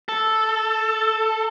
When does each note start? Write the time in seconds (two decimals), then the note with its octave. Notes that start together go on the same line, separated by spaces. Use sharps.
0.09 A4